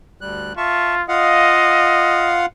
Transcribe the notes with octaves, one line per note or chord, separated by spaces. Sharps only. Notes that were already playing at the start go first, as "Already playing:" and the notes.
D2 G3 F#6
F4 E5 A5 C#6
F4 D#5 F5 F#5